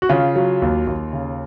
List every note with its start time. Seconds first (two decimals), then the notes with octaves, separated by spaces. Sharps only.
0.02 F#4
0.09 C#3 F4
0.36 F#3
0.62 D#2
0.87 D#2
1.13 C#3